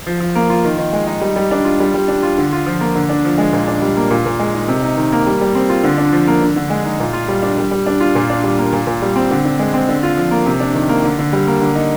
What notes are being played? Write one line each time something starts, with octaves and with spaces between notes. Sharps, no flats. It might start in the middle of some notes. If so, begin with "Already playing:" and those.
F3
F3
A#3
F4
D#3
D#3
G#3
D#4
G3
G3
D4
F4
G3
G3
D4
F4
D3
F4
F3
A#3
D3
D4
F3
G#3
A#2
D4
G3
A#3
A#2
A#2
G#3
D#4
C3
D#4
D#3
A#3
G3
G3
C4
F4
D3
D4
F3
A#3
D3
D3
G#3
D#4
A#2
F4
G3
D4
G3
G3
D4
F4
A#2
D4
G3
A#3
A#2
A#2
G3
C4
D3
D3
G#3
C4
D3
F4
F3
A#3
C3
D4
D#3
A#3
D3
D3
G3
A#3
D3
D#4